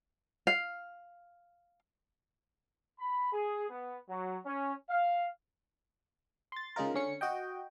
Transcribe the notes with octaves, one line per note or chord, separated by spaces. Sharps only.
F5
B5
G#4
B3
F#3
C#4
F5
C6 A6
C#3 G#3 D#4 F4 A#4
D3 C#4 C#7
F#4 D#5 G5